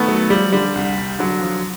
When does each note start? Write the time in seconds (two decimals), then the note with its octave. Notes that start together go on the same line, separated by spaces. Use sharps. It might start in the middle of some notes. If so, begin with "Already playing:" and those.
Already playing: D#3 A3 B3
0.08 F#3
0.30 F3 G3
0.52 D3 G3
0.75 C2
0.98 C2
1.19 D3 F#3
1.41 F3